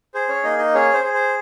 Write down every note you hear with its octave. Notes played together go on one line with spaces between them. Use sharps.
G#4 C5
C#4 C#5
A#3 D#4 D#5
D#4 D#5
C#4 G#4 C#5
C5
G#4
C5